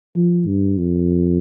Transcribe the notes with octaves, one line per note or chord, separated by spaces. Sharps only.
F3
G2
F2